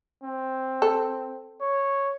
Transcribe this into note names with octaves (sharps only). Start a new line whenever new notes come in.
C4
A4
C#5